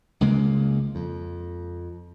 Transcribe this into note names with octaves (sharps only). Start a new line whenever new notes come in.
C#2 C#3 G#3 A#3
F2